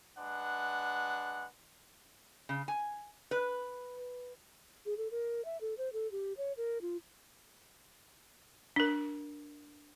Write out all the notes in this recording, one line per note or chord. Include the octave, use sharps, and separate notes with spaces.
G#3 D4 B4 F#5
C#3
G#5
B4
G#4
A4
A#4
E5
A4
C5
A4
G4
C#5
A#4
F4
D4 A#4